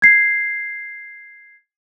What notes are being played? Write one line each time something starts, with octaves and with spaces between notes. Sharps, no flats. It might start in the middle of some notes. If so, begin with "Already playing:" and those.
G#6 C7